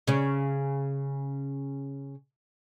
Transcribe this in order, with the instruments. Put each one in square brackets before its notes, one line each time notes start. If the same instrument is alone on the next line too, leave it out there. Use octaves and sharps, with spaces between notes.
[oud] C#3 C#4